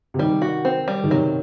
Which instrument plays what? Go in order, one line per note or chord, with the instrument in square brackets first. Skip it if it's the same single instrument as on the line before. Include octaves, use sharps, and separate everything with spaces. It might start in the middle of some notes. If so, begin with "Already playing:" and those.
[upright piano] C3
[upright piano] D#3 [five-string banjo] G3
[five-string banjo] F#4
C4
G3
[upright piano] D#3
[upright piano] C3 [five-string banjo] F#3